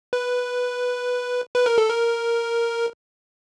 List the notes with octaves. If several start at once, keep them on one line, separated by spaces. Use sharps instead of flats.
B4
B4
A#4
A4
A#4